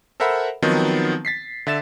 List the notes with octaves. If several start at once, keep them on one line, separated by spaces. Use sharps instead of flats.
A4 A#4 C5 E5 F#5 B5
D#3 F3 F#3 B3 C4 D#4
A6 B6 C7
D3 E5 A6 E7